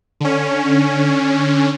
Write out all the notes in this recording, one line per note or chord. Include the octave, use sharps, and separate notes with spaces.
D3 C#4